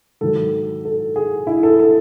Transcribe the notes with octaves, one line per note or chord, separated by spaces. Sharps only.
G#2 D#3 F#3 A4
A4
G#4
E4
A4
A4